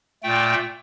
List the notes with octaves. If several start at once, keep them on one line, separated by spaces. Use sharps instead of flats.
A#2 A3 G5